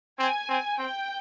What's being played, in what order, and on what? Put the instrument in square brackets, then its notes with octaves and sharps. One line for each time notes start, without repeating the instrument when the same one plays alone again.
[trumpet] C4 [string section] G#5
[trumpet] C4
[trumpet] C4 [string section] G5